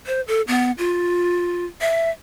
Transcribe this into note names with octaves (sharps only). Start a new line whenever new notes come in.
C5
A4
B3
F4
E5